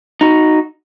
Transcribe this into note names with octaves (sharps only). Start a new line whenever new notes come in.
D#4 F#4